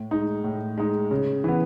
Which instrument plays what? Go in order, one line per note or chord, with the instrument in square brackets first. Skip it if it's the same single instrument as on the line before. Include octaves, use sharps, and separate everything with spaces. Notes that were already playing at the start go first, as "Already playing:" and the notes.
Already playing: [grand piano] A2
G#3 D#4
A2
G#3 D#4
C#3
E3 B3